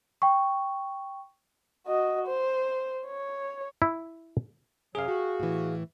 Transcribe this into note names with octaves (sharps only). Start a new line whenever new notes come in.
G5 C#6
F#4 D#5
C5
C#5
E4
F#2 C3 F#3 G#4 F5
F#4 G4
A2 E3